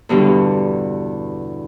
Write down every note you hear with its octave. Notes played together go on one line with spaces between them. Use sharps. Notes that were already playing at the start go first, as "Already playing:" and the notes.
E2 G2 B2 D3